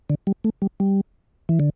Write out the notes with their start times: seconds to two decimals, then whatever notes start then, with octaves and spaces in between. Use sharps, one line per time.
0.10 D3
0.27 G3
0.44 A3
0.62 G3
0.80 G3
1.49 E3
1.60 D3